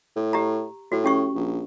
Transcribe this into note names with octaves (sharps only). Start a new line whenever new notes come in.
A2
G4 A#5
A2 F#4
C#4 G4 C#6
A#1